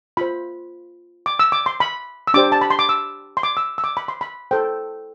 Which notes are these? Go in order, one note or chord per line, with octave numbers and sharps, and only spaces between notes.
F4 C5 B5
D6
E6
D6
C6
B5
E6
D4 G4 C5 D6
A5
B5
C6
D6
E6
C6
D6
E6
E6
D6
B5
C6
B5
E4 A4 C5 G5